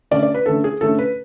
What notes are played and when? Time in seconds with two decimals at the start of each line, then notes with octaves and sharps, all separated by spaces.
0.11 D3 A3 C#4 D5
0.23 D5
0.34 B4
0.46 D3 A3 C#4 A4
0.64 G#4
0.81 D3 A3 C#4 A4
0.99 B4